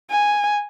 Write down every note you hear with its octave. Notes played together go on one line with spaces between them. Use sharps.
G#5